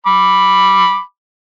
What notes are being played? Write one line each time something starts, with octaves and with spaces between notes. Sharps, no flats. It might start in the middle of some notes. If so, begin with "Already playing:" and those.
B5 D6